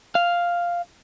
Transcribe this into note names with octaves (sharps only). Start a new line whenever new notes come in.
F5